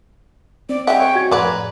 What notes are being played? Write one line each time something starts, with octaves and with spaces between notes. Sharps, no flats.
C4 D5
G3 G#3 E5 F#5 G5
C#5
C#4 F#4 G#6
F2 A2 G#3 B4 D5 F#5 A#5